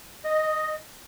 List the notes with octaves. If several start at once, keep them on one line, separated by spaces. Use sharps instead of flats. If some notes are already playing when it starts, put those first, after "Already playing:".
D#5